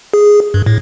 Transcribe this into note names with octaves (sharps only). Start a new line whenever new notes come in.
G#4
G2
A2